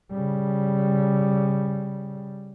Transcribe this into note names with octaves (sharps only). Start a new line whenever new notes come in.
C#3 G3